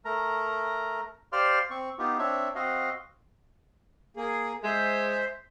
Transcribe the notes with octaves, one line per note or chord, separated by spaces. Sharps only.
A3 A#4 A#5
G4 C5 D5 F5 C6 F6
C4 C#6
B3 D#4 F4 G4
C4 D4 C#5 E5
C4 F#4 D#5 F5
A#3 G#4
G#3 C5 E5